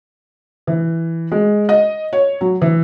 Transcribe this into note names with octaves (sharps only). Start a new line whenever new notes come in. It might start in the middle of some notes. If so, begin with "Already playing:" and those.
E3
G#3
D#5
C#5
F#3
E3